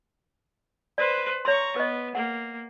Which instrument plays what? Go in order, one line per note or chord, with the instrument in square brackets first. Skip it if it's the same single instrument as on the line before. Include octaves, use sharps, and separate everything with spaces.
[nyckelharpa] B4 C5 [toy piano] D5
[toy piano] C#5 C6 [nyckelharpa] A#5 C#6
[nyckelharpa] B3 [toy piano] B4 D#5
[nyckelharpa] A#3 [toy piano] F#5